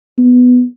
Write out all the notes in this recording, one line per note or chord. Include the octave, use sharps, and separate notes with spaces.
B3